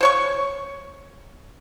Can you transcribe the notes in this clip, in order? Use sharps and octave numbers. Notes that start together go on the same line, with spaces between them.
C5 C#5 C#6